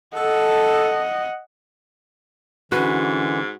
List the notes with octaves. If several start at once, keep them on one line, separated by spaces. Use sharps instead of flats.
A4 D#5 F#5
G#2 D3 E3 C#4 F#4 B4